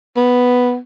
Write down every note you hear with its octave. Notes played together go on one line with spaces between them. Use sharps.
B3